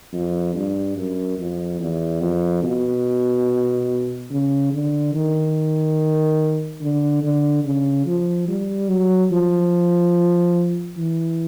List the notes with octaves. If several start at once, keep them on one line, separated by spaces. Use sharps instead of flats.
F2
G2
F#2
F2
E2
F2
B2
C#3
D3
D#3
D3
D3
C#3
F3
G3
F#3
F3
E3